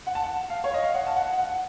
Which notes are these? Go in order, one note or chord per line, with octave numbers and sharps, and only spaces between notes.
F#5
A5
F#5
F5
C#5
D#5
F5
F#5
A5
F#5
F#5